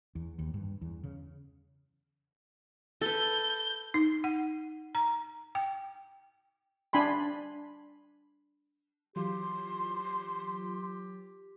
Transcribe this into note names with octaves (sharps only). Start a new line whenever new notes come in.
E2
D#2
G2
E2
C#3
A4 B4 G6
D#4
F#5
A#5
G5
D4 G#5 B5 C6
E3 F#3 F4 G4 C6